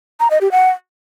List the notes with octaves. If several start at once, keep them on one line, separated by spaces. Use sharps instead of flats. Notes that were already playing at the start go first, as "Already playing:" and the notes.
A#5
D#5
G4
F#5